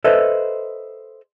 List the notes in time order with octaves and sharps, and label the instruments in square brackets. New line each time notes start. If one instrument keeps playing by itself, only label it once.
[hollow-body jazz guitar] A4 B4 C5 D#5 E5